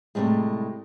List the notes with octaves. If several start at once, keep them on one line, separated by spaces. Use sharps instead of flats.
A2 C3 F3 G3 G#3